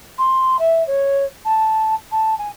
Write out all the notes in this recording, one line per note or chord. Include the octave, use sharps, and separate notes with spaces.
C6
E5
C#5
A5
A5
G#5